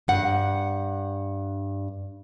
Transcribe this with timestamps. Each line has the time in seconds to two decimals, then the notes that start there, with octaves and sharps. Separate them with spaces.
0.08 G2 F#5